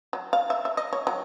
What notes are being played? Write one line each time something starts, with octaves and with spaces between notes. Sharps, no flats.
F#3
F5
E5
E5
D#5
C#5
F#3